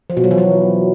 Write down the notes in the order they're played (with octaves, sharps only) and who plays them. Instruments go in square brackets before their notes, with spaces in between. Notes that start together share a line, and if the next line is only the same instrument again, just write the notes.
[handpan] F3
B2
F#3
E3
F#3